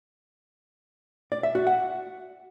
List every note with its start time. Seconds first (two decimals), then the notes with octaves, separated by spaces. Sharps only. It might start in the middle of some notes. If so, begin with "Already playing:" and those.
1.32 D5
1.43 E5
1.55 F#4
1.67 F#5